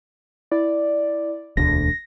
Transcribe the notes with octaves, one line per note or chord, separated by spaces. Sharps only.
E4 D5
E1 D2 D3 A#6